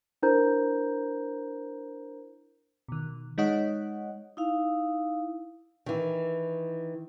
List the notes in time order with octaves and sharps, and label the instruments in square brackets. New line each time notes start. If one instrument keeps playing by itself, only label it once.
[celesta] D4 E4 A#4 C5 A#5 G6
[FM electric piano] B2 D#3
G#3 D#4 C#5 D#5 F#5
[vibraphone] D#4 E4 F5
[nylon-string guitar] D#3 E3